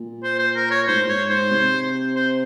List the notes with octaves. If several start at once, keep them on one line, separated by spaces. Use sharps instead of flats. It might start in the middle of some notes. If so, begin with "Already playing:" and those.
Already playing: A#2
C5
C5
A#4
C#5
G#2 C5
A#2
G#2
C#5
C5
C3
C5